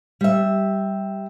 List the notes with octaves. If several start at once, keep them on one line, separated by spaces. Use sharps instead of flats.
G3 E5